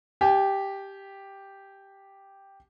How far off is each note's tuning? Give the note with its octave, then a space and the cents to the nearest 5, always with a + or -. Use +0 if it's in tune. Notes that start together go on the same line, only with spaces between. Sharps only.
G4 +0 G#5 +40